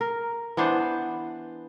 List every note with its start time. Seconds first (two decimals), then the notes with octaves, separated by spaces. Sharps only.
0.01 A#4
0.57 E3 B3 D4 C5